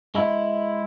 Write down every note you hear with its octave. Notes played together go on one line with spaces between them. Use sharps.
G#3 E4